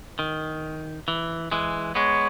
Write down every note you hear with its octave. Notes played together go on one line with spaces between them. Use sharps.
D#3
E3
E3 G#3
G#3 B3 C#5